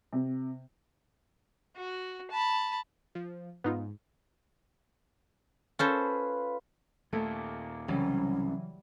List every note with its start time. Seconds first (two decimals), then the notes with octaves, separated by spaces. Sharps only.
0.13 C3
1.76 F#4
2.31 A5 B5
3.15 F3
3.64 G#2 B3 D#4 F4
5.79 C#4 F4 A4 B4 C5
7.13 D#2 A#2 A3 D5 E5
7.88 C2 C#3 E3 F#3 G3 C#4